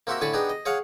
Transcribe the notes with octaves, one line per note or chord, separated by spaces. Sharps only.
A#3 C4 F#4 G4 E5
A2 D3 G#5 A5 B5 C#6
B3 D4 D#4 G4 G#4
D#5
G#4 C#5 F5 F#5